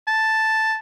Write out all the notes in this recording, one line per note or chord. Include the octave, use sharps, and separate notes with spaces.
A5